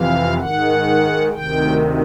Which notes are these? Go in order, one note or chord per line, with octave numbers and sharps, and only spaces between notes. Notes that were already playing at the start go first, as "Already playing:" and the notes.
Already playing: F2 C3 E3 F5
G#2 D#3 F#5
D2 C3 D#3 G5